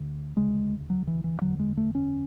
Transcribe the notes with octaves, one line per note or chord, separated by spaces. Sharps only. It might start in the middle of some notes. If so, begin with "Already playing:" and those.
Already playing: D2 D3
E1 D2 C#3 G#3
F#3
E3
E3
F#1 E2 D3 F#3
G#3
A3
C#4